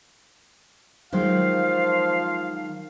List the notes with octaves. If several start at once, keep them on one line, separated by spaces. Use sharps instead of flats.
D#3 F3 F#3 G#3 F5